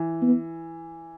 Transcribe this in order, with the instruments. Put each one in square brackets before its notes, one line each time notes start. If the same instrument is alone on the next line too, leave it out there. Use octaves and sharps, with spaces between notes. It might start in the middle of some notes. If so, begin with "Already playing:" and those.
Already playing: [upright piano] E3
[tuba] B3